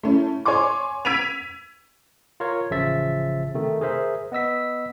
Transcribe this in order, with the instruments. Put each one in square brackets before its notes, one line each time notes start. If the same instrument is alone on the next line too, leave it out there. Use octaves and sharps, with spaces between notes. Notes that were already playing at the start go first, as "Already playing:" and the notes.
[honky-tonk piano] A3 C#4 E4
C#5 G#5 C6 D6
E6 G#6 B6 D7 D#7 F7
[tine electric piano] F4 A#4 C#5
A1 C#3 F3 E5 A6
C3 D#3 A3
G#4 A#4 C5 E5
B3 D#5 E6 B6